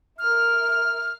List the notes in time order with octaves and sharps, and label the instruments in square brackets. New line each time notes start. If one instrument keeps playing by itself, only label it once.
[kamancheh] A#4 E5 [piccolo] F6